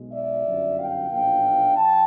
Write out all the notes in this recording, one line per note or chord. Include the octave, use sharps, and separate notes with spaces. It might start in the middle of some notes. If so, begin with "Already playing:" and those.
Already playing: B1 B2 G#3
D5 E5
G1 F#2 D#3
F5 G5
B1 A#2 F3 A#3 D4 F5 G5
F3 G5 A5